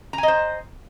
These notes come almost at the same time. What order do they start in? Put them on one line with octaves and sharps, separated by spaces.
A#5 G#5 D#5 C5